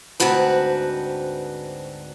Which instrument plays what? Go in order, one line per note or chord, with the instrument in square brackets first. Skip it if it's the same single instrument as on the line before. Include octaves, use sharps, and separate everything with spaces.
[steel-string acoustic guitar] D2 G#2 C4 F#4 B4 A5